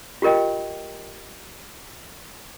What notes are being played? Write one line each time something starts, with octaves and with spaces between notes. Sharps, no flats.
F4 G4 A#4 D#5 G5